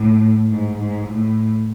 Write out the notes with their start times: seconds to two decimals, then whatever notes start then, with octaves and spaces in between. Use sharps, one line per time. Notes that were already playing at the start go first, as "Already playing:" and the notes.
Already playing: A2
0.51 G#2
0.79 G#2
1.07 A2